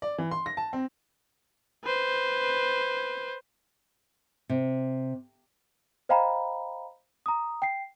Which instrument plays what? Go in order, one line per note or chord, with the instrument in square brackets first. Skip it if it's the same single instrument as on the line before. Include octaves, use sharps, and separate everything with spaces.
[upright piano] D5
E3
C6
A#6
A5
C4
[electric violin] B4 C5
[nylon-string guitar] C3
[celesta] C5 D#5 F5 G5 A#5 B5
A#5 D#6
G5 C7